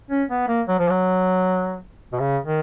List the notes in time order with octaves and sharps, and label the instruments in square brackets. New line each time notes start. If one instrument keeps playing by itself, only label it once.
[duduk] C#4
B3
A#3
F#3
F3
F#3
B2
C#3
D#3